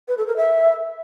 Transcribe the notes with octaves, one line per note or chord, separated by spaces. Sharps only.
B4
A4
A#4
E5